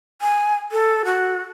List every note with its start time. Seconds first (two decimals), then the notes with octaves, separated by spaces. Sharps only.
0.22 G#5
0.72 A4
1.05 F#4